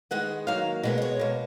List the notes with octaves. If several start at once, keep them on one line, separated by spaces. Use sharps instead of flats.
D#3 G#3 B3 F#5
D#3 F#3 A#3 F5
B2 G#3 B3 D#5
D#5
C#5
B2 A#3